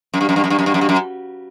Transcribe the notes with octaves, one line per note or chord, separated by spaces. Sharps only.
F#2
G2
F#2
G2
F#2
G2
F#2
G2
F#2
G2
F#2